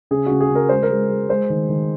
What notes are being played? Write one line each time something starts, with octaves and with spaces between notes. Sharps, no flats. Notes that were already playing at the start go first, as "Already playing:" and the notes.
C#3 G#4
C#3 F#4
G#4
C#3
A#4
G#3 C5
A#4
G#3
G#3
G#3 C5
D#3
D#3